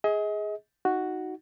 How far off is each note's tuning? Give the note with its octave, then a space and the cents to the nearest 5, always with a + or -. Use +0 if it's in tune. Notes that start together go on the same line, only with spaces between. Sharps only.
G#4 +0 D#5 +35
D#4 +10 F#4 +0